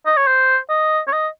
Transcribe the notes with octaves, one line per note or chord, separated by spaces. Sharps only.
D#5
C#5
C5
D#5
C#5
D#5